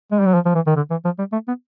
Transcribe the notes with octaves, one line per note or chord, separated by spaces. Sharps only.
G#3
G3
F#3
F3
F3
E3
D#3
D3
E3
F3
G3
A3
B3